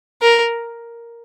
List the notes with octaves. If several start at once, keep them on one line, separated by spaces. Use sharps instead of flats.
A#4